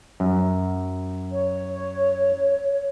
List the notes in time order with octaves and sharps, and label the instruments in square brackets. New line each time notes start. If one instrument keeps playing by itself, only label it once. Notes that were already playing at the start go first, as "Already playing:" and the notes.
[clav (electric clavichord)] F#2
[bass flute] C#5